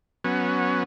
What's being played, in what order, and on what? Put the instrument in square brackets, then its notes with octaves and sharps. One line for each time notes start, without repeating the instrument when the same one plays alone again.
[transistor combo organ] F#3 B3 C#4